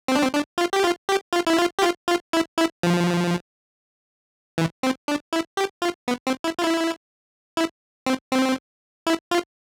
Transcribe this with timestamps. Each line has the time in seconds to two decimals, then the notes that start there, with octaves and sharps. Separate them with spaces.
0.08 C4
0.15 D4
0.23 C4
0.33 D4
0.58 F4
0.73 G4
0.84 F4
1.09 G4
1.33 F4
1.47 E4
1.58 F4
1.79 G4
1.83 F4
2.08 F4
2.33 E4
2.58 E4
2.83 F3
4.58 E3
4.83 C4
5.08 D4
5.33 E4
5.57 G4
5.82 F4
6.08 B3
6.27 C4
6.44 E4
6.59 F4
6.64 E4
7.57 E4
8.06 C4
8.32 C4
9.07 E4
9.31 F4